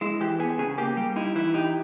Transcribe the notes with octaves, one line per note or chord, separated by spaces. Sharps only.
G#3 E4
E3 G4
B3 G#4
C#3 G#4
A#3 G4
G3 G4
D#4 E4
E3 E4
D#4 G4